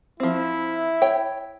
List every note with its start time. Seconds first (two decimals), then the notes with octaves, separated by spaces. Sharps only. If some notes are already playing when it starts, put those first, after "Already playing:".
0.20 F3 C4 E4
1.02 C#5 G5